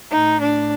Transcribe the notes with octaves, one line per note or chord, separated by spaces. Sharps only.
A2 D#4
D4